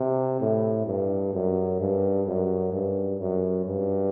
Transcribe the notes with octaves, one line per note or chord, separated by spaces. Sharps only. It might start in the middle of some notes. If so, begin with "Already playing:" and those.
Already playing: C3
A2
G2
F#2
G2
F#2
G2
F#2
G2